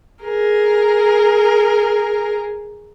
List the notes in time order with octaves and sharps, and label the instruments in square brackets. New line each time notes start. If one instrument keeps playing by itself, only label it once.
[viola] G#4 A#4